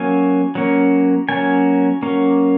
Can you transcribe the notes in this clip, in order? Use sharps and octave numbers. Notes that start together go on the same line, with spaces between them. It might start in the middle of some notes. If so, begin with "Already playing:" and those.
Already playing: F#3 A#3 C#4 G#5
F#3 A#3 C#4
F#3 A#3 C#4 G#5
F#3 A#3 C#4